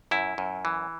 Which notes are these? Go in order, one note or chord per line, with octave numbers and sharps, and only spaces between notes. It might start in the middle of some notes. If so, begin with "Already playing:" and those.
F#2 E4
F#2
E3